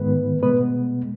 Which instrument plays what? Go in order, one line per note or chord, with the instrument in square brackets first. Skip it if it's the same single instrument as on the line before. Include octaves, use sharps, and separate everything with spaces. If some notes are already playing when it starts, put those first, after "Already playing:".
Already playing: [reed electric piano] G#2 D#3 G#3 B3 B4
B2 G#3 B3 B4